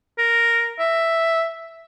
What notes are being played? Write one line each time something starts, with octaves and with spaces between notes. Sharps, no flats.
A#4
E5